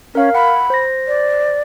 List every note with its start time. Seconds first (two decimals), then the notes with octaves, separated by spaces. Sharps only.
0.15 C#4 A#4 F5
0.34 F#5 B5
0.70 C5 A#6
1.07 D5